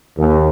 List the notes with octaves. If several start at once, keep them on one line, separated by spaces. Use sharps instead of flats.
D#2